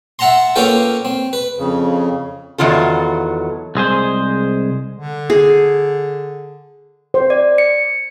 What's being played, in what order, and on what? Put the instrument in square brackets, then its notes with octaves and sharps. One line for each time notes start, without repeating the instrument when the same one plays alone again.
[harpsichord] E5 F#5 A5 A#5 C6
A#3 C#4 F4 A4 B4 G5
C4
B4
[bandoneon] F2 C#3
[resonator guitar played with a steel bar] E2 D#3 F#3 F4 A4
[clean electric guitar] C2 G#3 G#4 C5
[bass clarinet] D3
[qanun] G#4
[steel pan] C5
[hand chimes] D5
C#7